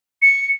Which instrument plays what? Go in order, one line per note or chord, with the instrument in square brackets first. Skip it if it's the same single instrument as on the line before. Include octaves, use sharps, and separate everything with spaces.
[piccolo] C#7